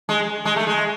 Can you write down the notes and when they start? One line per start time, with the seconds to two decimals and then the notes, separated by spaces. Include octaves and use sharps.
0.09 G#3
0.45 G#3
0.56 A3
0.67 G#3